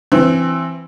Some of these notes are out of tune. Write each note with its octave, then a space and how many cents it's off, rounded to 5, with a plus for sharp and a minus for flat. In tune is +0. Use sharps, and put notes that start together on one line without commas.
E3 +20 C4 +10